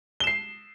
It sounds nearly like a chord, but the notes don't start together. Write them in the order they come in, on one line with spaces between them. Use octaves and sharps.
G7 E7 C7